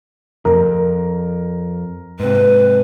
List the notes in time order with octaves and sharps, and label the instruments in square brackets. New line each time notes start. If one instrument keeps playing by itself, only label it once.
[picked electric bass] F2 [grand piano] A#4
[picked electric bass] G#2 C3 [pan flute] B4